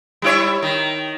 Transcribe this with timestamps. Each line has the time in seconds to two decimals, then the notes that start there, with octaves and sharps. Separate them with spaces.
0.22 G3 E4 C#5
0.63 D#3